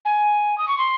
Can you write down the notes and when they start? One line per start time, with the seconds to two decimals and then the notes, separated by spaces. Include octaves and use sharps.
0.05 G#5
0.58 D#6
0.68 C#6
0.78 C6